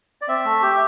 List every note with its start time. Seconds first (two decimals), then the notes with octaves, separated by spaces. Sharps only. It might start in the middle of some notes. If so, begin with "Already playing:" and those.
0.21 D5
0.28 C4 E5
0.45 A3
0.62 G4